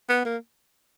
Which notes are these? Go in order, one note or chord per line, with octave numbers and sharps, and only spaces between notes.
B3
A#3